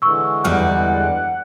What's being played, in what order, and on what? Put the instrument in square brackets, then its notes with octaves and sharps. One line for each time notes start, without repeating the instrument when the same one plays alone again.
[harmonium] D3 E3 G#3 [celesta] C#6 E6
[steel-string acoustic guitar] E2 G3 D5 [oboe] F#5 [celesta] F6